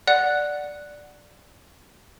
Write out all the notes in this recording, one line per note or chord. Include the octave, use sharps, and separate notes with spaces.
D5 F#5 F#6 C#7